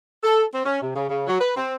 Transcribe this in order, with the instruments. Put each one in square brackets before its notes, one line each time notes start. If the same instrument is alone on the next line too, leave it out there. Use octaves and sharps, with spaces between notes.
[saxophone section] A4
C4
C#4
C3
C#3
C#3
F#3
B4
C4